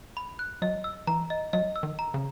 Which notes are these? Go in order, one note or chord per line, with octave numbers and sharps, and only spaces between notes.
B5
F#6
F#3 D#5
E6
E3 A#5
D#5
F#3 D#5
E6
D#3
A#5
C#3